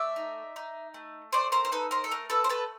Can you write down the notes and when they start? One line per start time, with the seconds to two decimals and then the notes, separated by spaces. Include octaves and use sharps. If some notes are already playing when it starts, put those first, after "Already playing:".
Already playing: A3 D5 E5
0.16 D#4
0.56 D#4
0.94 A3
1.33 A3 C5 D5
1.52 A#4 C5
1.65 C5
1.72 D#4 A4 B4
1.91 A#4 C5
2.04 A4
2.11 A3 A#4
2.30 A4 B4
2.44 C5
2.49 A3 A4 B4